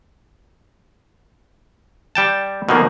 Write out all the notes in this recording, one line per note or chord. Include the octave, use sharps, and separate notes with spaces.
G3 G5 A5
B2 D3 D#3 F3 A#3